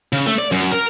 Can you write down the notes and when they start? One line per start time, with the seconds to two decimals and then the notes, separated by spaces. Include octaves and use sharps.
0.13 C#3
0.27 A3
0.38 D5
0.52 F#2
0.72 A#4